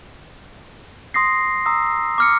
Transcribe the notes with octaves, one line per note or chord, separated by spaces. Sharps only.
C6 D#6 A#6 C7
A#5 D#6 E6
D6 F6 C#7